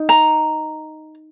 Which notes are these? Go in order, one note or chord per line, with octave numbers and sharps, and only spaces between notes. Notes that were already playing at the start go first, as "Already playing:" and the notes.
Already playing: D#4
A#5